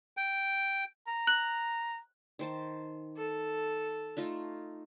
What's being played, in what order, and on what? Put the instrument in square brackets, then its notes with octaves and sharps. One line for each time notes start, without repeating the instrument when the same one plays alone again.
[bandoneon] G5
[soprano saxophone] A#5
[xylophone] F#6 F#7
[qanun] D#3 C5 A5
[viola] A4
[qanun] A3 D#4 F4